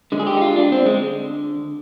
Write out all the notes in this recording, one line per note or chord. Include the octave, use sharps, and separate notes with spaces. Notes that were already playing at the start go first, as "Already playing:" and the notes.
D3 G#3
G#4
G4
D#4
F4
D4
C4
G#3